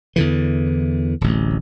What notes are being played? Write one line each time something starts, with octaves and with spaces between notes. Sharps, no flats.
E2 D3 E3
D1 A1